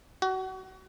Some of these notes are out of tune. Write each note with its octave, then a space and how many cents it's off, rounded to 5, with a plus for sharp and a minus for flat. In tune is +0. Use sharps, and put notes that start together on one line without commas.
F#4 +30